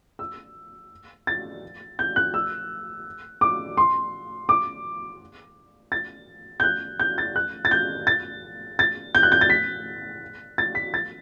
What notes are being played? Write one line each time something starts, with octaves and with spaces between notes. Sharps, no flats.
E6
A6
G6
F#6
E6
D6
C6
D6
A6
G6
F#6
G6
A6
F#6
A6
G6
A6
A6
G6
F#6
G6
A6
B6
A6
B6
A6